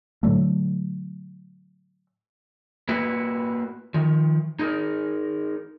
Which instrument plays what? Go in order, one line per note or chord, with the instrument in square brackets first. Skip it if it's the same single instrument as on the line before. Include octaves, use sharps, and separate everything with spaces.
[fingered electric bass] A2 D3 F#3 A3
[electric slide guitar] A#3 E4 F#4 B4
D#3 F3
D#4 G#4 A#4